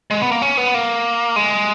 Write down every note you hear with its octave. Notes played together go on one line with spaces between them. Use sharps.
G#3
B3
A#3
C#4
B3
A#3
G#3